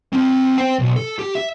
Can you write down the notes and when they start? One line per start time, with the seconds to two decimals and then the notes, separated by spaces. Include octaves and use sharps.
0.13 C4 A5
0.58 C5 G5
0.79 B1
0.96 A4
1.19 G4
1.35 E5